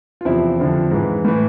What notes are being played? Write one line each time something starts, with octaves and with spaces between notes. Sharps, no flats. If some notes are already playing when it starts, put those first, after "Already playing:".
F4
E2 C3 F3 C4 E4
F2 D3 F3
G#2 E3
A2 E3